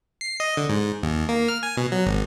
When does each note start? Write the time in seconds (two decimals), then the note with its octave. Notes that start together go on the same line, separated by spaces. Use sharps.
0.21 C7
0.40 D#5
0.57 D3
0.69 G#2
1.03 D#2
1.29 A#3
1.48 F6
1.63 G#5
1.77 B2
1.92 F#3
2.06 G#1